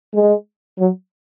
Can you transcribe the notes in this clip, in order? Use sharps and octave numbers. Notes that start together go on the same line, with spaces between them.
G#3
F#3